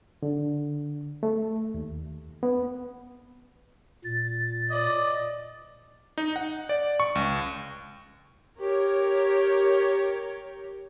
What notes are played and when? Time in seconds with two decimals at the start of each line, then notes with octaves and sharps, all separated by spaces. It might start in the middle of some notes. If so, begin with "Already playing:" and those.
0.23 D3
1.23 A3
1.74 D#2
2.43 B3
4.04 A#2 A6
4.71 D5 D#5
6.18 D#4
6.36 F#5
6.69 D5
7.00 C#6
7.15 C#2
8.59 G4 A#4 C#5